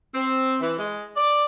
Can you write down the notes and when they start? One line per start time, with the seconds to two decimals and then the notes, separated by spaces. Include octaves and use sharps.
0.15 C4
0.61 E3
0.79 G#3
1.16 D5